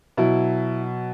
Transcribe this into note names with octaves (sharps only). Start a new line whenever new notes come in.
B2 F#3 E4